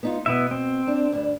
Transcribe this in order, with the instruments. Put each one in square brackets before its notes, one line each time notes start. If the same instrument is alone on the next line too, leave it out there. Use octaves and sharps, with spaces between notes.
[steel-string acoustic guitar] B3 D#4 F4
[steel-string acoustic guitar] B2 [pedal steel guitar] B3 E4 E5
[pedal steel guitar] C4
[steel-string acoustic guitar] D4
D2 G2 D4